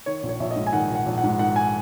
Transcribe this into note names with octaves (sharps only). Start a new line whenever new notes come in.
D#3 C#5
A#1
C#5
A#1 E5
D#5
G#2
G#5
D#3 F#5
A#1
F#5
A#1
F#5
G#2
D#3 F#5
G#5